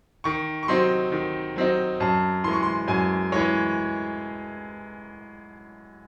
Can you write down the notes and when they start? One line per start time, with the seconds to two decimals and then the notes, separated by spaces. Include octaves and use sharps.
0.24 D#3 C#6
0.63 C#6
0.68 F#3 C4 D#4 C6
1.12 D#3
1.56 F#3 C4 D#4
2.00 F#2 A5
2.44 E3 G#3 C6
2.53 C#6
2.63 C6
2.88 F#2 G#5
3.32 E3 G#3 C#5